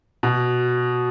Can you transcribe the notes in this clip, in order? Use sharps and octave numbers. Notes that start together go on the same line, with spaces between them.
B2